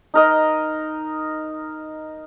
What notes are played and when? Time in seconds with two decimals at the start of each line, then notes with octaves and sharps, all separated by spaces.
0.14 D#4 A#4 D#5